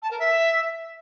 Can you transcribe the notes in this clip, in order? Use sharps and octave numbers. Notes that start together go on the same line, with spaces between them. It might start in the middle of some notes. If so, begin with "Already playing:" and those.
A5
A#4
E5